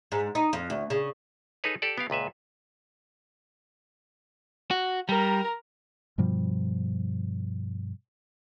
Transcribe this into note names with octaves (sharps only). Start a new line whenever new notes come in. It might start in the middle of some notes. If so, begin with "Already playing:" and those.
G#2
D#4
F2
D2
C#3
D#4 G#4 A4 B4 C#5
G4 A4 D5
B3 G4 F5
C#2 A#2 B4 E5
F#4
G3 A#4 A#5
G2 B2 F3 G3